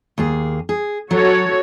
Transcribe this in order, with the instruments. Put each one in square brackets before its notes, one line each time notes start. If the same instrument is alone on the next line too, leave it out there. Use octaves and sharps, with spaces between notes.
[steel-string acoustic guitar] D#2 A#3 G#4
G#4
[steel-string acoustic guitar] F#3 [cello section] F#4 A4 C#5